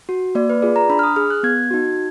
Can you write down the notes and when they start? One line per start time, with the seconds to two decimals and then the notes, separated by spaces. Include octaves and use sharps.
0.09 F#4
0.35 A#3 D5
0.49 B4
0.62 F4 G#4 D5
0.76 A#5
0.90 D4 B5
0.99 F6
1.03 D#6
1.16 G#4 F6
1.30 F#6
1.43 B3 G#6
1.71 D#4 F#4